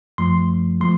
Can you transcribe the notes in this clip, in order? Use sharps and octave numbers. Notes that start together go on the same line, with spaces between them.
F#2 F3 A3 C6
F3 A3 C6